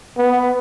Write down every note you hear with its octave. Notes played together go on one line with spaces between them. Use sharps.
B3